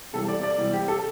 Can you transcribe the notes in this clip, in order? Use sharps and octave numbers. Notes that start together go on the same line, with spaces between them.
C3 E3 G3 A4
D5
D5
C3 E3 G3
G4
A4